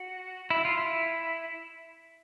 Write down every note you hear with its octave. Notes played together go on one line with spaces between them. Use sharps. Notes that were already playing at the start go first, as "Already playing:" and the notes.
Already playing: F#4
E4
F4
E4